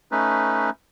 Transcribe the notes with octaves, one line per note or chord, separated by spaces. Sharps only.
A3 C#4 D#4 B4